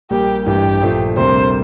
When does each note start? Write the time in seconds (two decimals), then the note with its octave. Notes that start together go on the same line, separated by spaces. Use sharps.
0.11 A#1 A#2 G3 G4
0.46 A1 G2 E3 G4
0.81 A#1 A#2 F3 A3
1.16 D2 C3 G3 A#3 C5